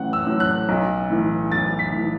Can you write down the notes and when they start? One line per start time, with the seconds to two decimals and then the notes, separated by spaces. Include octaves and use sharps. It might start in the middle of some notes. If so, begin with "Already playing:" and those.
Already playing: A1 A2 F#3 F#5
0.13 E6
0.27 A2 F#3
0.40 F#6
0.69 B1
1.10 A2 E3
1.51 B1 A6
1.79 B6
1.93 A2 E3